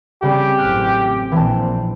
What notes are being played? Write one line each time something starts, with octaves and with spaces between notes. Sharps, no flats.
C#3 G3 C4 G4
A1 F#2 C4 F6 F#6
A#1 E3 C4 G5 A5